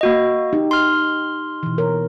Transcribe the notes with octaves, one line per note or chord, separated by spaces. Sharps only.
A#3 F#4 D#5
D#4 G4
C6 F6
B2 E3
A#4 C#5